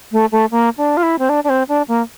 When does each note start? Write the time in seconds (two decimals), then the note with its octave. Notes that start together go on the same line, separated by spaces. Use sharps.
0.12 A3
0.32 A3
0.51 A#3
0.77 D4
0.97 F4
1.03 E4
1.19 C4
1.29 D4
1.44 D4
1.49 C4
1.69 D4
1.88 A#3